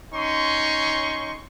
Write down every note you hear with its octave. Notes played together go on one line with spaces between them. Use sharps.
C#4 D#4 C6 C#6